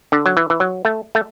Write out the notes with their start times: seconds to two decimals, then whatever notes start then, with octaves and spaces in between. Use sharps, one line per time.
0.12 D3
0.26 F#3
0.37 E3
0.50 E3
0.60 F#3
0.85 A3
1.15 A3